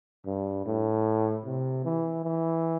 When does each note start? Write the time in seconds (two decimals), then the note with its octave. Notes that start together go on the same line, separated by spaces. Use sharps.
0.26 G2
0.66 A2
1.45 C3
1.85 E3
2.24 E3